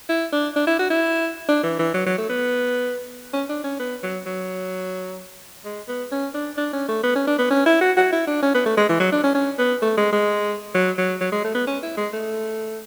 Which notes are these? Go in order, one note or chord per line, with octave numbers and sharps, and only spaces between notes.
E4
D4
D4
E4
F#4
E4
D4
E3
E3
F#3
F#3
A3
B3
C#4
D4
C#4
B3
F#3
F#3
G#3
B3
C#4
D4
D4
C#4
A3
B3
C#4
D4
B3
C#4
E4
F#4
F#4
E4
D4
C#4
B3
A3
G#3
E3
F#3
D4
C#4
C#4
B3
A3
G#3
G#3
F#3
F#3
F#3
G#3
A3
B3
C#4
E4
G#3
A3